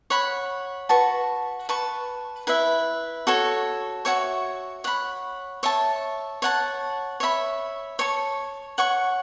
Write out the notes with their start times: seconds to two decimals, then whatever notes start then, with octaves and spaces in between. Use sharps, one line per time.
0.10 C#5 F#5 B5
0.89 F#4 B4 A5 C#6
1.69 B4 A5 C#6
2.47 E4 B4 E5
3.27 F#4 A4 C#5
4.05 F#4 C#5 E5 C#6
4.84 C#5 F#5 B5
5.63 C#5 E5 A5
6.42 C#5 F#5 A5
7.20 C#5 E5 B5
7.99 C#5 A5 C#6
8.78 C#5 F#5 C#6